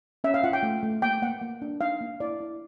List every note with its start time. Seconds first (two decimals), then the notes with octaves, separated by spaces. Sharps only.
0.24 C#4 E5
0.34 F5
0.44 F4 F#5
0.53 G5
0.63 A3
0.83 A3
1.02 A#3 G5
1.22 A#3 F#5
1.42 A#3
1.62 D4
1.81 D#4 F5
2.01 A#3
2.20 E4 D5
2.40 E4